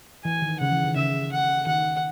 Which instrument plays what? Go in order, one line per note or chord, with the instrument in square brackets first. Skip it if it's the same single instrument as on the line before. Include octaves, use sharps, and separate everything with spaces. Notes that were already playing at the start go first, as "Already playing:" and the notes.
[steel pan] E3 [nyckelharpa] G#5
[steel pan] D#3
[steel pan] C#3 [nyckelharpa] F#5
[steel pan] E3
D#3
[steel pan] C#3 [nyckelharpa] E5
[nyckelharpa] F#5
[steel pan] D#3 [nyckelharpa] F#5